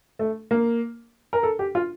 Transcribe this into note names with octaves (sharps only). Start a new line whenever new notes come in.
A3
A#3
A#4
A4
G4
F4